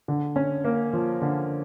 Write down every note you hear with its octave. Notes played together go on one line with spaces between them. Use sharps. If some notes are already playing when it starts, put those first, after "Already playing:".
D3
C#4
A#3
F3
D3